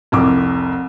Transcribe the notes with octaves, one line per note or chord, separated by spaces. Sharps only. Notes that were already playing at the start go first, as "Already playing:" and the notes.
F1 C2 D6